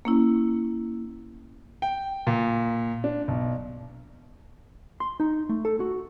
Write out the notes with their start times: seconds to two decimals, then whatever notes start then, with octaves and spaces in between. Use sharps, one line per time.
0.05 A#3 C#4 E4
1.82 G5
2.27 A#2
3.04 D4
3.28 B1
5.00 C6
5.20 D#4
5.49 A3
5.65 A4
5.80 F#4